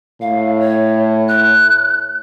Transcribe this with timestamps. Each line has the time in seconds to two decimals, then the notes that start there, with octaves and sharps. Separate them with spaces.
0.21 A2 F5
0.60 C#5
1.29 F#6